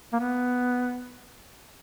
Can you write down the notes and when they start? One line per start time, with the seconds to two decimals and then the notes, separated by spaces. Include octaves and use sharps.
0.13 A#3
0.20 B3